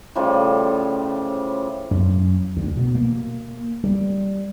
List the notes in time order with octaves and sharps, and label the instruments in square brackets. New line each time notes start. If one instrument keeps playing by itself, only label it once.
[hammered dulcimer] A2 C#3 F3 G3
[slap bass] F#2
D2
B2
A#3
G3